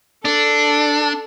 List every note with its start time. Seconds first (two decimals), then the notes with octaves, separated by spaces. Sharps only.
0.25 D4 A4